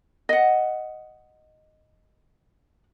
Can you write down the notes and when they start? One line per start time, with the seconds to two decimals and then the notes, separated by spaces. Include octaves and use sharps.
0.29 D#5 F#5